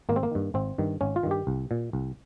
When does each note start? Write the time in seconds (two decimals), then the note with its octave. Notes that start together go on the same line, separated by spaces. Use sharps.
0.09 G#1 A#3
0.16 C4
0.23 A#3
0.31 G2 D#3
0.54 G#1 C4
0.78 G2 D#3
1.01 G#1 C#4
1.16 F4
1.23 G2 D#3
1.31 G4
1.47 C2
1.71 A#2
1.93 C2